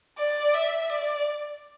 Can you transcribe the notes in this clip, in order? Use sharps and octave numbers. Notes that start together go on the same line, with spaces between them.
D5
E5
D5